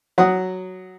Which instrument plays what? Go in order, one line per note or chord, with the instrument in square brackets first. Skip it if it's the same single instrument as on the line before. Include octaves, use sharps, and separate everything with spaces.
[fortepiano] F#3 F#5 D#6